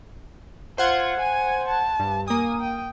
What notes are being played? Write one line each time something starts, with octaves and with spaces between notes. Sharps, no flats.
F4 C5 F#5 G#6
G#5
A5
G2
A#3 G#5 D#6
G5